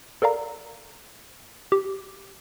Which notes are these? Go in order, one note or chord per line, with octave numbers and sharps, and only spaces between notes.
A4 A#4 D5 F5 A#5
G4